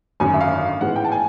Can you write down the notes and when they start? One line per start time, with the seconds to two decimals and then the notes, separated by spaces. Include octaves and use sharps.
0.20 G#1 F#2 D3 G#5
0.34 E5
0.41 F5
0.81 A1 G#2 E3 G#3 B3 F#5
0.96 G5
1.04 A5
1.12 G#5